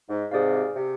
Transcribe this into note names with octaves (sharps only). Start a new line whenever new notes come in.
G#2
G#2 C3 G#4 D5 F5
C3